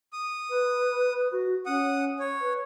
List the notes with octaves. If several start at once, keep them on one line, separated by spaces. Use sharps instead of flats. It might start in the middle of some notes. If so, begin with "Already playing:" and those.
D#6
B4
F#4
C#4 F#5 D#6
C#5
B4